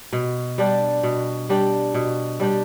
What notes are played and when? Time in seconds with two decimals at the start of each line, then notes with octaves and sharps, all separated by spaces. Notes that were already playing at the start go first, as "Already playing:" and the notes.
0.13 B2
0.58 G3 D4 G4
1.03 B2
1.49 G3 D4 G4
1.94 B2
2.40 G3 D4 G4